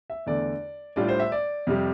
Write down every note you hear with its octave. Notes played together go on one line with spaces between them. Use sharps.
E5
E2 D3 A3 D5
A2 G3 D4 F4 D5
C5
E5
D5
F2 C3 G3